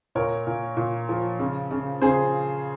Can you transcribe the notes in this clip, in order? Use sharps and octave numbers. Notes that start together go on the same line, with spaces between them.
A#2 A#4 C#5
A#2
A#2
F3
C#3
C#3
C#3 G#4 C5